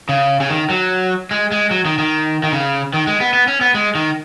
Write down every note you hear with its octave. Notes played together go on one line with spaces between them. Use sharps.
C#3
C#3
D#3
F#3
G#3
G#3
F#3
D#3
D#3
D#3
C#3
D#3
G#3
B3
B3
C#4
B3
G#3
D#3